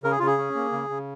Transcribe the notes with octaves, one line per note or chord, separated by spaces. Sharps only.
C#3 A#4
G#4
C#3 F4
G#4
C#4
A#3
C#3
C#3